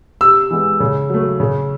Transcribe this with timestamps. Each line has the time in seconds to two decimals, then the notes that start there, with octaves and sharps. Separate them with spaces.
0.21 C3 E6
0.51 E3 G#3 B3
0.80 C#3
1.10 F#3 A3
1.40 C#3